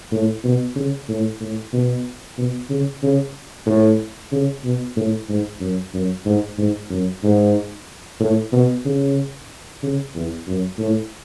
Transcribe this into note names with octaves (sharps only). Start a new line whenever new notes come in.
A2
B2
C#3
A2
A2
B2
B2
C#3
C#3
A2
C#3
B2
A2
G#2
F#2
F#2
G#2
G#2
F#2
G#2
A2
B2
C#3
C#3
E2
F#2
A2